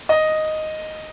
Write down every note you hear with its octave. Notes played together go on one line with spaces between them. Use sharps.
D#5